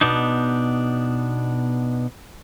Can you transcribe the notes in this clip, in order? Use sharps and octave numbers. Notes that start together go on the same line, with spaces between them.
B2 B3 D4 D#4